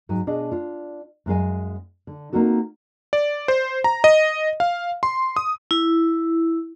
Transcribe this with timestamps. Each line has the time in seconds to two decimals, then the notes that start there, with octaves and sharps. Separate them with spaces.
0.09 G#2 F#3 D#4 G#5
0.27 B2 D4 G#4 D#5 F5
0.52 D4 F4
1.26 F#2 G#3 F5 G#5
2.07 D3
2.33 A#3 C4 D#4 F#4 A4
3.13 D5
3.48 C5
3.84 A#5
4.04 D#5
4.60 F5
5.03 C6
5.36 D#6
5.71 E4